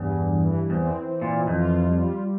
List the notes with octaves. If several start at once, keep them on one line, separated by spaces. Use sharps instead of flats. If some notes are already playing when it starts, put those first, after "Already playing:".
Already playing: E2 G2
E3
E2 C4
E3
A#2
F2 F4
G3